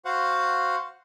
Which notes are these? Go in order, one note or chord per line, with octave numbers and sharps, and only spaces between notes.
F#4 C5 F5 F#5